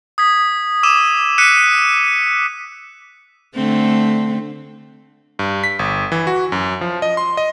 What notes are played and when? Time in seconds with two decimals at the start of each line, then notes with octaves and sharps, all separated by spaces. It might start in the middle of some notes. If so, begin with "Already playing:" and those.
0.18 D#6 G#6 B6
0.83 D6 E6 D#7 E7
1.38 F#6 B6 C#7 D#7
3.55 D3 A3 C4
5.39 G2
5.64 B6
5.79 G1
6.12 E3
6.27 F#4
6.52 F#2
6.81 F3
7.02 D#5
7.17 C6
7.37 D#5